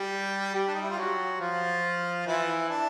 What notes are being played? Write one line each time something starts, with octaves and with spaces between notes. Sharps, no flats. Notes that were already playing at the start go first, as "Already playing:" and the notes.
Already playing: G3 G4
G3 G4
D4
D#4
E4
F4
F#3 F#4
F3 F4
E3 E4
D4